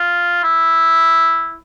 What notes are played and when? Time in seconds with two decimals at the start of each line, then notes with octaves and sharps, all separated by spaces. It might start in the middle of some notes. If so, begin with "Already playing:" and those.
Already playing: F4
0.43 E4